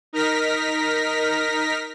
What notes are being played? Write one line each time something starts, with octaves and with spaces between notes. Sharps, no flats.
D#4 A#4 F6 A#6 B6